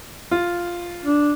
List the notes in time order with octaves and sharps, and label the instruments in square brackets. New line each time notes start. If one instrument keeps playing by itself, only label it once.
[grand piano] F4
[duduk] D4